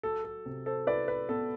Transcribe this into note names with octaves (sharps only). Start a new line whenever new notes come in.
F#3 A4
A4
C3
A4 C5
E4 B4 D5
B4
B3 A4